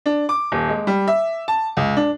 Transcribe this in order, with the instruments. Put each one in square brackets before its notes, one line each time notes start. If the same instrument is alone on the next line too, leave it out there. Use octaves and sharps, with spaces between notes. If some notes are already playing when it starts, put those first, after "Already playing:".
[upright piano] D4
D6
D#1
G#3
G3
E5
A5
C#2
D4